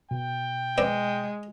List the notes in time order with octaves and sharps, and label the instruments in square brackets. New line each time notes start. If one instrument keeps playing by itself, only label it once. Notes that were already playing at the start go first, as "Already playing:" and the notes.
[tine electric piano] B2 [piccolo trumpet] G5
[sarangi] G#3 [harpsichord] C4 B4 D5